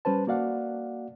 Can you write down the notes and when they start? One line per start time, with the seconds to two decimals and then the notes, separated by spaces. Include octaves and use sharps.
0.05 G3 C#4 B4 C5 A5
0.27 A#3 F#4 D5 F5 F#5